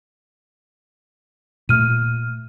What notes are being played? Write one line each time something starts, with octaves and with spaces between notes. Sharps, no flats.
A#2 A3 F6 D#7